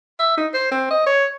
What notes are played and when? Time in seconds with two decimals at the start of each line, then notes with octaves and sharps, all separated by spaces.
0.20 E5
0.37 D#4
0.54 C5
0.71 C4
0.91 D#5
1.06 C#5